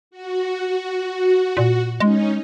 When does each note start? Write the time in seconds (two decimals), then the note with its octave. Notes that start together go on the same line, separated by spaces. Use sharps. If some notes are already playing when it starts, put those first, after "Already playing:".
0.11 F#4
1.57 A#2
2.00 G#3 C#4 D#4